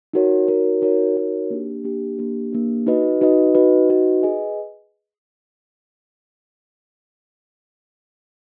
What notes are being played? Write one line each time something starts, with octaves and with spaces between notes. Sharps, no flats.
D#4 F#4 A#4 C#5
D#4 F#4 A#4 C#5
D#4 F#4 A#4 C#5
D#4 F#4 A#4 C#5
A#3 D4 G4
A#3 D4 G4
A#3 D4 G4
A#3 D4 G4
D#4 F#4 B4 D#5
D#4 F#4 B4 D#5
D#4 F#4 B4 D#5
D#4 F#4 B4 D#5
G#4 B4 D#5 G#5